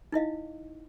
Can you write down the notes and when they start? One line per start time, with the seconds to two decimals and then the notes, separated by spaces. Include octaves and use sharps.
0.12 D#4 E4 D#5 F5